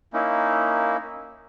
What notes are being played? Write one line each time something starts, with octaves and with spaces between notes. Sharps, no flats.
A#3 C#4 D#4 E4